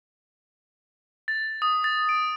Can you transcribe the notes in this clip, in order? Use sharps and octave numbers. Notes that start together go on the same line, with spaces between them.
A6
D#6
A6
D7